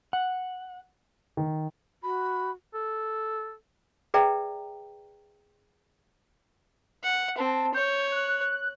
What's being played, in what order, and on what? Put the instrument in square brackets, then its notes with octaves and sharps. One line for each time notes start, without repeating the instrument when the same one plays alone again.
[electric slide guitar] F#5
[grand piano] D#3
[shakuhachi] F#4 [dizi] B5
[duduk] A4
[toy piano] G#4 B4 D5 E5 G5 A#5
[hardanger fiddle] F#5
[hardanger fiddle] C4 [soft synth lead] A5
[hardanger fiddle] C#5 [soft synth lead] G6
[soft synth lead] F#6